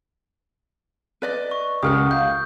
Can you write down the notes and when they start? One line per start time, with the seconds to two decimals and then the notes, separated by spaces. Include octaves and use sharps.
1.22 B4 D5 D#5
1.51 C#6
1.83 C#2 G4 A#4 F#5 D#6
2.11 F5 G6